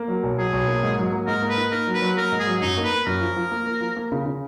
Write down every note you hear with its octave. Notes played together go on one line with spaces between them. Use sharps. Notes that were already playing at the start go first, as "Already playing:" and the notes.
Already playing: A#3
F#3
B1
F#3 G#4
B1
A#3
G#2
F#3
A#3
G#2 A#4
A#3
B4
D#4
A#3 A#4
F#3
B4
F#3
A#3 A#4
G#2
G#4
F#3
F#2 D#4
A#3
B4
A#3
F#2 A#4
F3
F3
A#3
A#3
F3
A#3
C#3
C#3